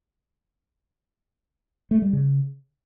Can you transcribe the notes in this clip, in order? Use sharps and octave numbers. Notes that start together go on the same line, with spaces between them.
A3
G3
C#3